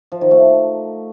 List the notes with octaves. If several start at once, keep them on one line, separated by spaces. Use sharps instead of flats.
F3
D#3
A3